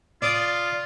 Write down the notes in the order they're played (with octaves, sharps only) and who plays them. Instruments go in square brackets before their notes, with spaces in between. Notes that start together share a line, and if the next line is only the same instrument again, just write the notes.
[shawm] F4 [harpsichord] D5 D6 D#6